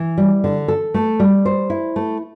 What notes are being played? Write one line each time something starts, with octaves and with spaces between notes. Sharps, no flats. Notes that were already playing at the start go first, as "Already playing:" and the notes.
Already playing: E3
G3
D3
A4
A3
G3
C5
E4
A3